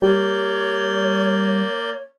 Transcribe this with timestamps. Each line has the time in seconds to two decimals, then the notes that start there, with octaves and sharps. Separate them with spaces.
0.02 G3 A#3 C#5 D5 G6